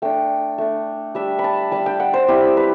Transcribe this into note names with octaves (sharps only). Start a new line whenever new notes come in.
A3 D4 G5
A3 D4
G3 D4 E5
B5
A5
G3 D4 A5
G5
F#5
C5
G3 C4 E4 G4
B4